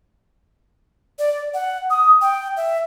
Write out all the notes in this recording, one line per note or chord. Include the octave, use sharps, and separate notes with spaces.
D5
F#5
D#6
G5
E5